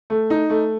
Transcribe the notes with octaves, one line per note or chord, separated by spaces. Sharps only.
A3
D#4
A3